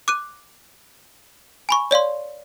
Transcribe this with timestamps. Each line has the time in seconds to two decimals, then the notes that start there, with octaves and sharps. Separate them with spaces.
0.08 D6 F#6 D#7
1.69 G#5 B5 C#6
1.91 C#5 D5 F5 C6